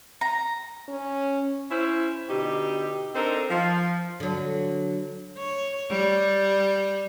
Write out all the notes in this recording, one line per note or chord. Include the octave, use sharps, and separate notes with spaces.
A#5
C#4
C#4 E4 C5
B2 D3 D#4 G4
C4 D4 D#4 A4 A#4 C5
F3
D3 F#3
C#5
G3